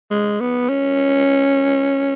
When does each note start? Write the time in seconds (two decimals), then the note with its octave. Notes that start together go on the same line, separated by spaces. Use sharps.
0.11 G#3
0.40 B3
0.69 C#4